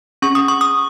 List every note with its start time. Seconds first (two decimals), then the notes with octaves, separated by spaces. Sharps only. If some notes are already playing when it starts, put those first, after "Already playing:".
0.22 C#4 G#4 C#6
0.35 D#6
0.48 C#6
0.61 D#6